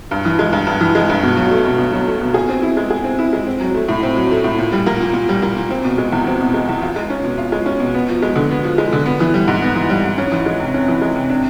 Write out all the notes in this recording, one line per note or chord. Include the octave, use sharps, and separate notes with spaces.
G2
E3
G#3
G2
G2
E3
G#3
G2
B2
F#3
A3
B2
B2
F#3
A3
B2
G#4
C4
E4
G#3
G#4
C4
E4
G#3
C4
F#3
A3
A2
C4
F#3
A3
A2
A#2
G3
A#3
A#2
A#2
G3
A#3
A#2
C4
B2
G#3
E2
C4
B2
G#3
E2
F4
G#3
C#4
B2
F4
G#3
C#4
B2
B3
F3
G#3
D3
B3
F3
G#3
D3
B3
E3
G3
G#2
B3
E3
G3
G#2
C#4
E3
G#3
C3
C#4
E3
G#3
C3
D4